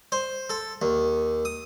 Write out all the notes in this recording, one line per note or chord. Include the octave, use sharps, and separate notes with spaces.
C5
A4
D#2
D#6